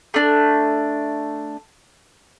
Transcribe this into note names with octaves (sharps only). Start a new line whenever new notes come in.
A3 D4